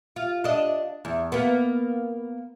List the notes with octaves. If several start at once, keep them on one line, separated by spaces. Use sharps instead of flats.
F4
D4 D#5
E2
A#3 B3